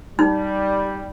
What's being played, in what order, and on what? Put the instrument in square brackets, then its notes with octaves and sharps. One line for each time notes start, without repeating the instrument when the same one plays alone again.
[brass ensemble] G3 [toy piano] D#4